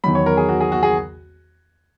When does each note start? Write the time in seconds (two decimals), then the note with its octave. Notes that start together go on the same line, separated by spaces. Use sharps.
0.04 E2 D#3 F#3 B5
0.15 C#5
0.26 A#4
0.37 G#4
0.49 F#4
0.60 G#4
0.72 F#4
0.83 G#4